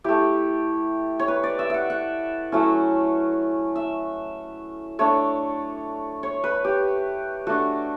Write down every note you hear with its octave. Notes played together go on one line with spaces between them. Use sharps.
A3 E4 G4
C#5
B4
D5
E5
E5 F#5
F#5
F#3 A3 C#4 E4
E5
A3 D4 C#5
C#5
B4
G4
A3 D4 F#4